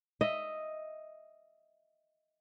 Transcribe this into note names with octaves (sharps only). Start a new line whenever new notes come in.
D#5 E5